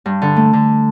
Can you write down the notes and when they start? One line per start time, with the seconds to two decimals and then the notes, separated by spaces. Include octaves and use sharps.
0.06 G2
0.22 D3
0.36 A3
0.53 D3